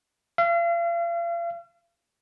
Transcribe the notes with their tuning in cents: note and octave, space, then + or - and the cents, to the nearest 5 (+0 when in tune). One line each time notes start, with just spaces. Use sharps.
F5 -40